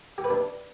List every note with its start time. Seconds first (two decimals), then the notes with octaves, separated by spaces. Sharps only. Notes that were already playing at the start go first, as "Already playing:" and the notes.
0.18 G4
0.24 B4
0.30 D4